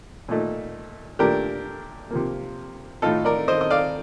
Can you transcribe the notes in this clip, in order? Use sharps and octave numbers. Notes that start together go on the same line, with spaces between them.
A#2 A3 D#4
A#2 A3 D4 G4 A#4
C3 F3 A#3
A2 A3 D#4 F4 A4
A#4 D5
C5 D#5
D#5
D5 F5